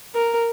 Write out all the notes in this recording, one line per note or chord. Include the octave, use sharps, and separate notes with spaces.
A#4